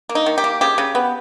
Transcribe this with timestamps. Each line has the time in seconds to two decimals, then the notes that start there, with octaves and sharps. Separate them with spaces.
0.09 A#3
0.15 D#4
0.26 D#3
0.38 G4
0.44 A#3
0.61 C#3 G4
0.78 C#3
0.95 B3